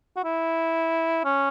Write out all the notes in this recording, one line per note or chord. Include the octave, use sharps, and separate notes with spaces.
F#4
E4
C#4